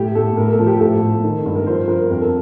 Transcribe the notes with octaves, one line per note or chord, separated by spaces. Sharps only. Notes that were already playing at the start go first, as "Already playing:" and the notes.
Already playing: A2 G4
A2 A4
A2 A#4
A4
F3
G4
A2 A4
A2
D#3
G2
A#4
F3 C5
F3 A#4
F2 A#4
A4